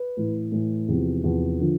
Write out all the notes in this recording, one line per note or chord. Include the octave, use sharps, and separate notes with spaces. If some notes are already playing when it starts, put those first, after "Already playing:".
Already playing: B4
A2 E3
A2 E3
E2 C3 F3
E2 C3 F3
D3 F3